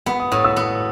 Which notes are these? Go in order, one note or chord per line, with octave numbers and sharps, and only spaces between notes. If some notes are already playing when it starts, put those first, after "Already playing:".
B3 B5
D#6
A2 D#6
E6
B3 D#6